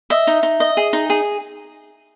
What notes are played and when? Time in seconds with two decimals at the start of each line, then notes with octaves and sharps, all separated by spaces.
0.10 D#5 E5
0.27 D#4
0.43 D#4
0.60 D#5
0.77 G#4
0.93 D#4
1.10 G#4